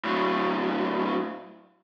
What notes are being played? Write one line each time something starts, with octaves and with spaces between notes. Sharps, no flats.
A2 F#3